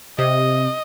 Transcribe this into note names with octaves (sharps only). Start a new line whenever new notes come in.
C3 D#5